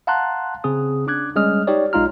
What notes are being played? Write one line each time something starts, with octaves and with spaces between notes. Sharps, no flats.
F5 F#5 A5 A#5 C6 F#6
C#3 C4 G#4 D#6
C#4 D4 D6 F#6 G#6
G3 G#3 C#4 D#6 F6
D#4 G4 C#5 D5
B1 G#3 D#4 F4 A#5 F6